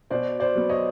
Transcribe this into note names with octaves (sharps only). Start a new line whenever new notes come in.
B2 C5 D5
C5 D5
F#3 B3
C#5 D#5